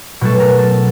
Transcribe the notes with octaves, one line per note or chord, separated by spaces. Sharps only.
B2 F#3 A3 A4
A#4
A4